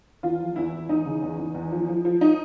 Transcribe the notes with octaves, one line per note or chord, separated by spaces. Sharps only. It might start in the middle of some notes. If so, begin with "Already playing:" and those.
E2 F4
F3
E2 E4
E2
E2 D#4
C#3
E2
E2
E2
F3
F3
F3
D#4